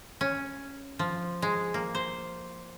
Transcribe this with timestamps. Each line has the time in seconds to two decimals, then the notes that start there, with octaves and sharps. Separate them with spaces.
0.21 C#4
0.99 F3
1.42 G#3
1.74 A#3
1.95 C5